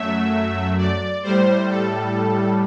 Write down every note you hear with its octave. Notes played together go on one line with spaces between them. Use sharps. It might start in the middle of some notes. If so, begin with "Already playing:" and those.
Already playing: F#2 F#3 A3 E5
D5
A2 G3 C5
A4